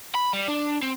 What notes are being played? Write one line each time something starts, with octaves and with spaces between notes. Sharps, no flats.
B5
G3
D4
C4